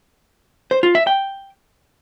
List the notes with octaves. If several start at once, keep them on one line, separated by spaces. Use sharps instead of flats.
C5
F4
E5
G5